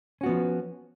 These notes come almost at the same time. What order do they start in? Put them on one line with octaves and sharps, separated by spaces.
C#4 F#4 B3 F3